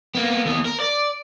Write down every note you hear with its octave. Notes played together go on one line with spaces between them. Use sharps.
A#3 B3
D#2 B3
A#4
D5